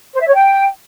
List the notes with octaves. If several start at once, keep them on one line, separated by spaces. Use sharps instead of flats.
C5
E5
C#5
G5